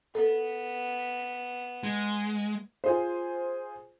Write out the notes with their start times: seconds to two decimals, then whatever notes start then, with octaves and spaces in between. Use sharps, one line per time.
0.15 B3 A4
1.84 G#3
2.84 F4 G#4 C5